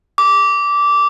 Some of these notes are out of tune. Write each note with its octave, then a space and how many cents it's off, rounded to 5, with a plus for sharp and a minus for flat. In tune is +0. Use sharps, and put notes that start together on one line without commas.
D6 -15